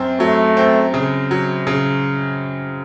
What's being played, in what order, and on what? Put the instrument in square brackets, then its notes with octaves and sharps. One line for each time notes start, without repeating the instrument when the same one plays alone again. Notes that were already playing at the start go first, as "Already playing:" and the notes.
Already playing: [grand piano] F#2 C4
[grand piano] F#3 [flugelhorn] A3
[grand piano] C4
C#3
F#3
C#3